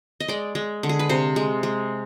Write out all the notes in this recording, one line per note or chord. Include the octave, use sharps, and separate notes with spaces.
D#5
G#3 D5
G#3
D3
G#4
B4
C3 C5
G#3
G#3